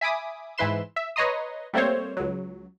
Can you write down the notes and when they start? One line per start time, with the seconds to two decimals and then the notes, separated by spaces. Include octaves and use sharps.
0.01 E5 G#5 B5 D6 D#6
0.58 G#2 E3 E4 B4 C6 E7
0.96 E5
1.16 B4 C#5 D#5 A#5 C6 D#6
1.73 G3 A3 A#3 C4 C5 C#5
2.17 C#2 F#3